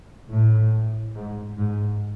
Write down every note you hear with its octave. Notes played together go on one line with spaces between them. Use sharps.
A2
G#2
G#2